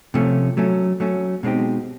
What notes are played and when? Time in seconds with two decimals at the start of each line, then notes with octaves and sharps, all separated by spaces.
0.14 C3 F3 A3 C#4
0.57 F#3 A3 C#4
1.00 F#3 A3 C#4
1.43 B2 G#3 C4 D#4 G4